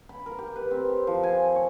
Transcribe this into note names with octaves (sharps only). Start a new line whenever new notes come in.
B5
A#4
G4
B4
C4
G4
F3
G#5
C#5